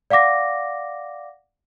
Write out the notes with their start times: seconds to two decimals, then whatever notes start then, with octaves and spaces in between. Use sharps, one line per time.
0.10 D5 F5 F#5 D6 A#6